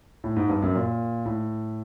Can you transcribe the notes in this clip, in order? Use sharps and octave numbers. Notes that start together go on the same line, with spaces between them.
A2
G#2
G2
F#2
A#2
A2